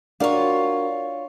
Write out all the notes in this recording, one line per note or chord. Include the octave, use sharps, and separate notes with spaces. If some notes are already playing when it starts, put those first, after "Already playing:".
D4 F4 F#4 A#4 C#5